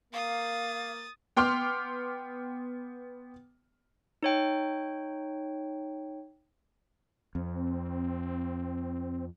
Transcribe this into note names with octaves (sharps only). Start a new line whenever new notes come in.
A#3 F5 D#6 A6
B3 G5 C6 D6 F6
D#4 C#5 G5
F2 C4